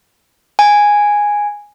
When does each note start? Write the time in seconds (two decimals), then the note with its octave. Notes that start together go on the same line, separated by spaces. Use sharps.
0.59 G#5